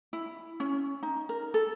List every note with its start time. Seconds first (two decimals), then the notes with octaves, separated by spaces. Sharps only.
0.13 E4
0.60 C#4
1.03 D#4
1.29 A#4
1.54 A4